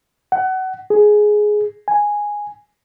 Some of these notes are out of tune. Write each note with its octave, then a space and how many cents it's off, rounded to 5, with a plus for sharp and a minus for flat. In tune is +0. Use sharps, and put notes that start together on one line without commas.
F#5 +25
G#4 +10
G#5 -5